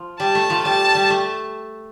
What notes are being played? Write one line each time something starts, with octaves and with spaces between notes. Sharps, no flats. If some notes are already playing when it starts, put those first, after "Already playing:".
Already playing: F3
G3 A5
A3
F3
G3 A5
G3
A3